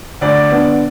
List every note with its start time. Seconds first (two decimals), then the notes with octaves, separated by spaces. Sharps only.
0.21 D2 D5
0.50 D3 B3